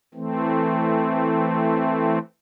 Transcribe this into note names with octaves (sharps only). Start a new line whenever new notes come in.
E3 A3 C4